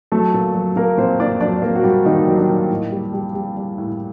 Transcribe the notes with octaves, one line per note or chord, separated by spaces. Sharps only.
F#3 A3 A4
A#2
F#3
A#2 A#3 A#4
A#2 C4 C5
A#2 D4 D5
F#3 D4 D5
F#3 A#3 A#4
F#4
A#2 G3 G4
A#2 D#3 D#4
F#3
D4
A#2
A2
G3
G3
G3
G3
A2